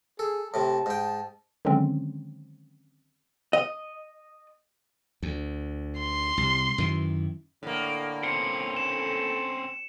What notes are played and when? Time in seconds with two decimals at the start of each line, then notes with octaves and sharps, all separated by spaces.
0.19 G#4 A4
0.54 A2 C3 A5
0.86 G#2 G5
1.65 D3 D#3 F#3 G#3 C4 C#4
3.53 D#5
5.23 D2
5.99 C6
6.37 C2
6.78 F#2 D#3 E3
7.63 A2 D3 A#3
8.23 C4 C#4 C#7
8.77 A4 E7